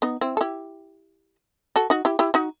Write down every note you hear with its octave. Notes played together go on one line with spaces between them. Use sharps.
B3 D#4
C4 E4
A4
E4 G4
F#4 A4
D#4 F#4
E4 G4
E4 G4
D#4 F#4